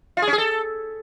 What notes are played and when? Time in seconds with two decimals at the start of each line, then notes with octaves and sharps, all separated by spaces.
0.17 F4
0.22 G#4
0.27 C#4
0.33 G#4
0.38 A4